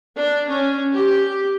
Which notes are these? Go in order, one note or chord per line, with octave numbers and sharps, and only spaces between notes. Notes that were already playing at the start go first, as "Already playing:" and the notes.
D4
C#4
G4